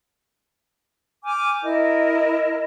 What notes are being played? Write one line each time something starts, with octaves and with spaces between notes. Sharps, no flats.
G#5 D6 F6 G6
E4 A#4 D#5